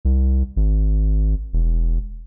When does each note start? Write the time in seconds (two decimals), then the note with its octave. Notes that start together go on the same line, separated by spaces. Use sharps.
0.05 C2
0.56 G#1
1.53 E1